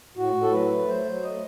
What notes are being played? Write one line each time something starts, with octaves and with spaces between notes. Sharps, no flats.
A2 F#4
A2
A4
F#3 B4
A3
F#3 C5
F#3
A3 D#5